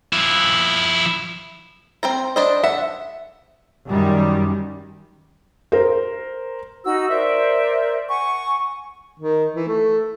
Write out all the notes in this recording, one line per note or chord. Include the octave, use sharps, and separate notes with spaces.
F3 E4
C4 C5 A#5
D4 C5 D#5
E5 F#5
F#2 D#3 G3
A#4 C5
D#4 F#4 E6
A#4 C5 D5 E5
F#5 G#5 C#6
D#3
E3
A3